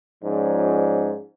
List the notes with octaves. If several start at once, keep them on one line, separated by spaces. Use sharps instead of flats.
G#2 F3 C#4 D5